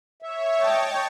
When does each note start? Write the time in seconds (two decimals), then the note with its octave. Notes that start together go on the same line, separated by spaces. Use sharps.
0.22 C#5 E5
0.63 D#5 G5 A5